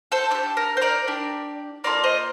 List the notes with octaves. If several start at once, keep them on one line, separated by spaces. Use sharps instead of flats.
A4 C5
D4 G4 A4
A#4
C5
A#4 D5
D4 G4
A#3 D4 F4 A4 A#4 D5
C5 D#5